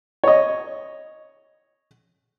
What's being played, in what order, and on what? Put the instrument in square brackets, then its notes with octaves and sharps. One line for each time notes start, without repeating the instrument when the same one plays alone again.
[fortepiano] C#5 D#5